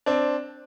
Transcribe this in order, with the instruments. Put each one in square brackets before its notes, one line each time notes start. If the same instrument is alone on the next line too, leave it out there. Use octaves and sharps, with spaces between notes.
[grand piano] C4 D4